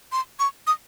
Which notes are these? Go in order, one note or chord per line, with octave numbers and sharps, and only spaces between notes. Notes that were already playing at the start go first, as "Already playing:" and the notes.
C6
C#6
D#6